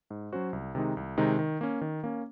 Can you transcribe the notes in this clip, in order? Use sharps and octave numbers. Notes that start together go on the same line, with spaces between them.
G#2
F#3 C#4 F#4 C5
C2
C3 D#3 G#3 D#4
C2
C3 D#3 G#3 D#4
D#3
A#3 C#4
D#3
A#3 C#4